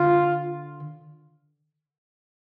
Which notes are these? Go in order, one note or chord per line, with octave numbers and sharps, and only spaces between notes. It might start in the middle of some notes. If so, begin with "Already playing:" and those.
Already playing: D3 F4